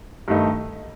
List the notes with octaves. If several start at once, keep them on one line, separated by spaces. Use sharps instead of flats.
G2 D#3 A3 D#4